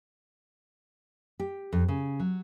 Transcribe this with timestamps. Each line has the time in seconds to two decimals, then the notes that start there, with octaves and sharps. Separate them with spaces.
1.39 G4
1.72 F2
1.88 C#3
2.20 F#3